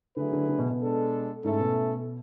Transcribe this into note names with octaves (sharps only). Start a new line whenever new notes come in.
D3 F#3 A3 E4 G#4 B4
D3
D3
B2
B2
G#3 D4 A4
G#2 A3 C#4 E4 A4
B2